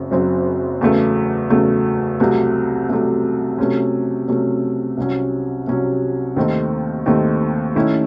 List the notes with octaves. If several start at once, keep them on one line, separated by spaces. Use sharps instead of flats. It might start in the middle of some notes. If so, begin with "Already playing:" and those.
Already playing: F#1 F#2 C#3 F#3 C4
F#1 F#2 C#3 F#3 C4
E2 C#3 F#3 A3
E2 C#3 F#3 A3
C2 C3 F#3 A3
C2 C3 F#3 A3
C3 F#3 A3 C#4
C3 F#3 A3 C#4
C2 C3 F#3 C#4
C2 C3 F#3 C#4
D#2 D#3 A3 C4
D#2 D#3 A3 C4
D#3 A3 C#4 E4